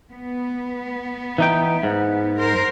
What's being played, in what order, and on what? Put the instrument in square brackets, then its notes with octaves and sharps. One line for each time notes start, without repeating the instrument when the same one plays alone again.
[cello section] B3
[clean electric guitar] E3 D#4 G5
G#2
[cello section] A#4 C5